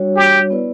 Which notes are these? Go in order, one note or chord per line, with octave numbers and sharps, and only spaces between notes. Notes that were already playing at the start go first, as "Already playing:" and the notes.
Already playing: G3 D4 F#4 C#5
G4
B3 E4 B4 D5